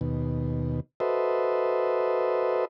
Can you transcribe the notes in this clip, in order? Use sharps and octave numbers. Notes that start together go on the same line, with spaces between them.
D#2 B2
F#4 A4 B4 C5 D#5 E5